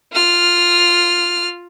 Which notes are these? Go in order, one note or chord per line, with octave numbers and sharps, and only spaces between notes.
F4 F6